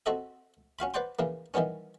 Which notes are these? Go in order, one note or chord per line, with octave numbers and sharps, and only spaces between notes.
C4 F#4 A4 D#5 E5
C#4 F#4 F5 B5
B4 C5 D5 F#5 G5 C6
C#3 E3 A#3
D#3 E3 G3 B3 C#4